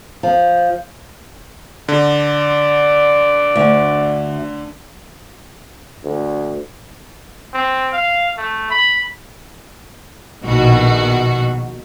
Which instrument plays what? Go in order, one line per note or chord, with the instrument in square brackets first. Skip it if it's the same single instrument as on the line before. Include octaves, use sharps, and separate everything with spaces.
[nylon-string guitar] F3
[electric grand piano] D3 [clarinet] D5
[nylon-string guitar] D2
[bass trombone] D2
[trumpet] C4
F5
A3
B5
[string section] A#1 B2 D#3 F#4